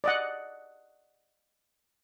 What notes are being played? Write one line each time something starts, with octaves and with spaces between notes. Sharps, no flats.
D5 D#5 F#5